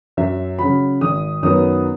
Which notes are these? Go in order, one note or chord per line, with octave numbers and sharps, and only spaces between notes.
F#2 E5
C#3 F#3 B5
G#1 D#6
F#2 D#3 F#3 B3 D#6